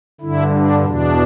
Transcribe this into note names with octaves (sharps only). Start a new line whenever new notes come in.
G2 D3 E4
D4
E2 B2 D4